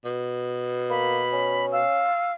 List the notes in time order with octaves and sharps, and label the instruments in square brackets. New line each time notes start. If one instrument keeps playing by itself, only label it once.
[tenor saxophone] B2
[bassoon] A#3 [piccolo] B5
[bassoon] C#4
[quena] F5 [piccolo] E6